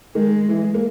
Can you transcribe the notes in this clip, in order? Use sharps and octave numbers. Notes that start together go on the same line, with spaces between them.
D#3 G#3
E3
A#3